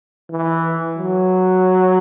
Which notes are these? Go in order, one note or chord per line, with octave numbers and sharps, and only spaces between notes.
E3
F#3